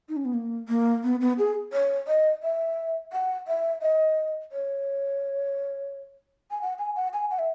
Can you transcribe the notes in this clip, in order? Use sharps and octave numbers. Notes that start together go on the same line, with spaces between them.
D#4
C#4
B3
A#3
A#3
B3
B3
G#4
C#5
D#5
E5
F#5
E5
D#5
C#5
G#5
F#5
G#5
F#5
G#5
F#5
E5